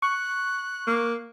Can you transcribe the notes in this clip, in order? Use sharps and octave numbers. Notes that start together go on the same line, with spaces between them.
C#6 F#6
A#3